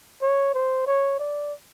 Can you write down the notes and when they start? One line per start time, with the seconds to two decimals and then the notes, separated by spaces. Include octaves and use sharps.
0.22 C#5
0.54 C5
0.87 C#5
1.19 D5